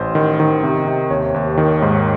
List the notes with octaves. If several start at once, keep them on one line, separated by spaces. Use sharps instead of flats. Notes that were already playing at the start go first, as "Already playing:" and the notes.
Already playing: A1 C5
D#3
D#3
C3
C3
D#2 C#5
D#2
D#3
G#2